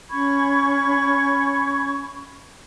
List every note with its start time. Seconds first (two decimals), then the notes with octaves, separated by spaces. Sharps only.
0.11 C#4 B5 C#6 G#6